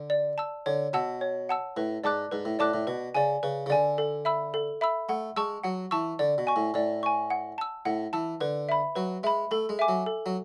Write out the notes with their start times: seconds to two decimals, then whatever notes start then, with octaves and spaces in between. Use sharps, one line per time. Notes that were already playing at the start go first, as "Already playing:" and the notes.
Already playing: D3
0.10 D5
0.38 A5 E6
0.66 D3 C#5
0.93 B2 F#5 A5 E6
1.21 C#5
1.49 F#5 A5 E6
1.77 A2 B4
2.04 G#2 D5 A5 D6 F#6
2.31 G#2 B4
2.45 A2
2.59 A2 D5 A5 D6 F#6
2.74 A2
2.87 B2 B4
3.14 C#3 D5 G#5
3.43 C#3 B4
3.66 C#3
3.70 D3 D5 G#5
3.98 A4
4.25 E5 B5 E6
4.54 A4
4.81 E5 B5 E6
5.09 A3 F#5
5.36 G#3 A5 C#6 E6
5.64 F#3 F#5
5.91 E3 A5 C#6 E6
6.19 D3 D5
6.38 B2
6.47 G#5 C#6
6.56 A2
6.74 A2 D5
7.03 G#5 C#6
7.30 F#5
7.58 A5 E6
7.85 A2 F#5
8.13 E3 A5 E6
8.41 D3 B4
8.69 E5 B5
8.95 F#3 B4
9.23 G#3 E5 B5
9.51 A3 A4
9.69 G#3
9.79 E5 G#5 D6
9.88 F#3
10.06 A4
10.26 F#3